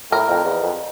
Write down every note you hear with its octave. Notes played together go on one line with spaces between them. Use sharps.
A2 A#4
F2
E2
F2